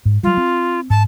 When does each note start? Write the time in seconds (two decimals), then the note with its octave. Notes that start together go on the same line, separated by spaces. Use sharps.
0.05 G#2
0.23 F#3 G3 F4
0.37 C4
0.90 G#2 A5